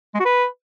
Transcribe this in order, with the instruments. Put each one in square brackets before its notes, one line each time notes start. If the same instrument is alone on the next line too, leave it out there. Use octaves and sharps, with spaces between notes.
[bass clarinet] G#3
F#4
B4